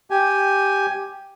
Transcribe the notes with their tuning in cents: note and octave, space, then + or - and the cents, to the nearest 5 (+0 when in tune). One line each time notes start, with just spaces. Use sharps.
G4 +0 G#5 +0